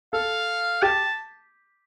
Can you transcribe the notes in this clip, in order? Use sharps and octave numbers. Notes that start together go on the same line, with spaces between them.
A4 F5
G4 A5